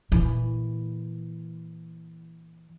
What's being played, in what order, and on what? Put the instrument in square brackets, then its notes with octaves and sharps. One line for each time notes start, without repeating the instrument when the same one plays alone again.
[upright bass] A#2 E3